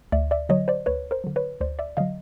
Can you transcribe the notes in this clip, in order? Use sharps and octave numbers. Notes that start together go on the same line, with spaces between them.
D2 D5 E5
D5 E5
D3 F#3 C#5 D#5
C5 D5
D2 B4 C#5
A#4 C5
D3 F#3
B4 C#5
D2 C5 D5
D5 E5
D3 F#3 D#5 F5